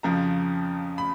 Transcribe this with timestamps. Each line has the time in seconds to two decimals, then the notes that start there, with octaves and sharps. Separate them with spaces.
0.03 F2 C#3 F3 A#5
0.98 B5